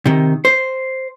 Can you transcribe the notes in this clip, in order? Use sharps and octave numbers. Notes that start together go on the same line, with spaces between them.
C3 D#3
C5